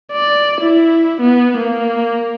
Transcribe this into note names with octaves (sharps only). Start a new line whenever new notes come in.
D5
E4
B3
A#3